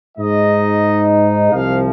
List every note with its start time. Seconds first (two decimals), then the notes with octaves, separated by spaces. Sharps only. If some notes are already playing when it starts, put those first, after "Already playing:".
0.18 G#2 G#3 D#4 D#5
1.53 C2 C3 F3 F5